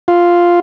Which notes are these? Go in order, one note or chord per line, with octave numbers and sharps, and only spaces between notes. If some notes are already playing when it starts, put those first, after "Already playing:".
F4